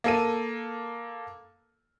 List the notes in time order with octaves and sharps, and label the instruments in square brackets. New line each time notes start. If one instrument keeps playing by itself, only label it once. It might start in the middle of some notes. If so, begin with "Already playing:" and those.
[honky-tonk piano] A#3 A4 D#7